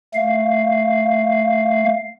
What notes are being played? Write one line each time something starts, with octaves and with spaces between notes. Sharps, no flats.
A3 F5